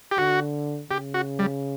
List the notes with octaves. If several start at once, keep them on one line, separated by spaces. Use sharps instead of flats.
G4
D3 F#4
C#3 G4
F#4
G3